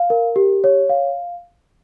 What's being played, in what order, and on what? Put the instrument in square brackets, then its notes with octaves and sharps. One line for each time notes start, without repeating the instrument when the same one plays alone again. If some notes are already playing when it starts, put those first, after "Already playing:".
Already playing: [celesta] F5
A#4
G4
C#5
F5